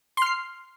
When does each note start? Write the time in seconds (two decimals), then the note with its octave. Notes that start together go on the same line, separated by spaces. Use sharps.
0.17 C6
0.22 F6
0.26 C7